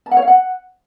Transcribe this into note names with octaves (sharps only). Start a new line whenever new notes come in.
A5
F#5
C#5
F5
F#5